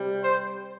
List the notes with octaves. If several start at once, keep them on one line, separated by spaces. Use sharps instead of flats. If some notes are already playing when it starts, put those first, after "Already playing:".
Already playing: C3 G3
C5